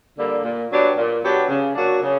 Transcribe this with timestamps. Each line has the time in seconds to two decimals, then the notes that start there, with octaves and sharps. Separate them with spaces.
0.18 D3 G3 A#3
0.43 A#2
0.70 F#3 B3 D4 G4
0.97 A#2
1.23 F#3 B3 D4 G4
1.49 C#3
1.75 F#3 A#3 D4 F#4
2.03 C#3